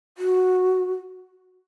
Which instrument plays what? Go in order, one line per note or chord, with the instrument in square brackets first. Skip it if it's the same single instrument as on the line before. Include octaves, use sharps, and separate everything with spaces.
[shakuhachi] F#4